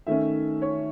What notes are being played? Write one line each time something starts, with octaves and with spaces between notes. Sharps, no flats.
D#3 A3 C#4 E5
C#5